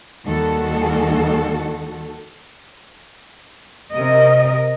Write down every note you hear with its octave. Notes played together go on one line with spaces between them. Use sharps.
D#2 D#3 G3 F#4 A4
C3 A#4 D#5